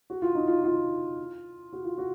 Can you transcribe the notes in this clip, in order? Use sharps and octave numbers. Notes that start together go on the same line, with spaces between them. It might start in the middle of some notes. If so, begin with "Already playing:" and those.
F#4
F4
D#4
F4
F4
F#4
F4
F#4